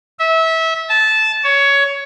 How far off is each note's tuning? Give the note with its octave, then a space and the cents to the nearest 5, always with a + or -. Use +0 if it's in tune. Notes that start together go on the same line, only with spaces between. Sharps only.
E5 -25
A5 -15
C#5 +15